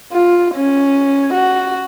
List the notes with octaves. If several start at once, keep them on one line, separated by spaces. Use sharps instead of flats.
F4
C#4
F#4